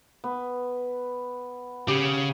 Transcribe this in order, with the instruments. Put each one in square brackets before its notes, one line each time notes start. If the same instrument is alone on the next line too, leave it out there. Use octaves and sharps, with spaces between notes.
[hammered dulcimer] B3
[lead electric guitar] C#3 [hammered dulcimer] G4